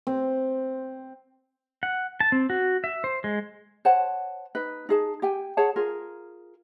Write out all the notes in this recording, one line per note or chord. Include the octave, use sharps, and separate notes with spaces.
C4
F#5
A5
C4
F#4
E5
C5
G#3
C5 C#5 F#5 A5
D#4 B4
D#4 G#4 A5
G4 G5 G#5
G#4 C#5 F#5 A5
F4 G#4 A#4